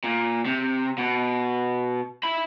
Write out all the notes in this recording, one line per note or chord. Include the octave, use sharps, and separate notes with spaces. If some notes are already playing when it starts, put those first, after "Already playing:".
A#2
C3
B2
E5 B5